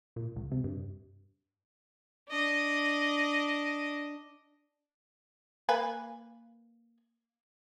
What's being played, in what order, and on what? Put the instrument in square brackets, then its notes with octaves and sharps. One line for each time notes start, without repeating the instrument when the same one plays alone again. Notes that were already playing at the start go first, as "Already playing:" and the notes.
[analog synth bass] A#2
C#2
C3
G2
[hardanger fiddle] D4 D#5
[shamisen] A#3 B4 G#5